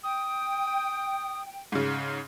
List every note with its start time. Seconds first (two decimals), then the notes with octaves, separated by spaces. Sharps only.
0.03 G5 D#6
1.72 G#2 C#3